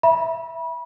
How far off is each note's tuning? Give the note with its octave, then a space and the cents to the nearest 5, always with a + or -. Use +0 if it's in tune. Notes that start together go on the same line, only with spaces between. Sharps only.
E5 +0 B5 -30